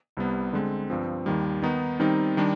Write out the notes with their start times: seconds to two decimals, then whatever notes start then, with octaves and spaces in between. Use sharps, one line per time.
0.17 C2 C3 G3 B3
0.53 D3 G#3 C4
0.90 G2 F3 C4
1.26 D#2 D#3 G3
1.62 D#3 B3 D#4
2.00 D#3 G3 C4 D#4
2.37 D#3 G3 D4